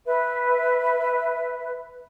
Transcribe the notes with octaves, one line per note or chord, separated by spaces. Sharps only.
B4 E5